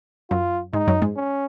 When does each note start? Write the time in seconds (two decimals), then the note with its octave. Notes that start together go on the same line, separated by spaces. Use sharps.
0.30 F#2 F#3 F4
0.73 G#2 G#3 D#4
0.87 F#2 F#3
1.02 G#2 G#3
1.16 C#4